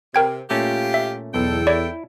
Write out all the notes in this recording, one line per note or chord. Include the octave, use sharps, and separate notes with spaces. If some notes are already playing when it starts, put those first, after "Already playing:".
C3 A#4 G5 G#6
A#2 A3 C#4 F4 G4
E5
B1 E2 A4 G5
E4 C#5 D5